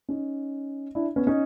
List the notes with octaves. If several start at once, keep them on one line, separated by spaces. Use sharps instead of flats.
C#4 D#4
D4 E4
B3 C#4
C#4 D#4